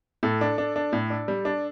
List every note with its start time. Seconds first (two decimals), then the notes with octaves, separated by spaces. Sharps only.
0.23 A2 A4
0.41 D4
0.58 D4
0.76 D4
0.93 A2
1.10 D4
1.28 G3
1.45 D4